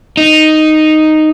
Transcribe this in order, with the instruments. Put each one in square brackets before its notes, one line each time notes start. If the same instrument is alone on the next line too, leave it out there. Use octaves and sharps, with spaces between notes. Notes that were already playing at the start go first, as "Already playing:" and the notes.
[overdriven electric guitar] D#4